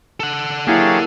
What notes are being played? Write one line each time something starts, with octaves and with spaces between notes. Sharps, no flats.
A4 F#5
F#3 A#3 E4 G4 G#4 F5 C#6 A6